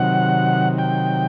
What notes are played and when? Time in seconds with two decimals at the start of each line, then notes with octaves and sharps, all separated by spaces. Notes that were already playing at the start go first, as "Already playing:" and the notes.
Already playing: C3 D#3 F#3 F#5
0.78 G5